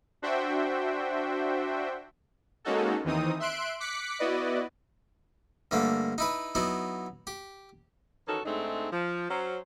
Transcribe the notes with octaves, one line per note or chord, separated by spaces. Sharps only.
D4 F#4 C5 E5 G5
G#3 A#3 C#4 D#4 F#4 A4
D#2 D#3 E3 C4 D#4 D#6
E5 C6 F#6 D7
D6 F#6 B6 C#7
B3 E4 F#4 B4 D5 D#5
G2 D3 A3 A#3
D#4 E4 B4
F#3 B3 D#4 E4
G4
D#3 E3 C#4 D#4 F#4 A4
G#2 G#3 A3 C4 D4 D#4
F3
F#3 C#4 C5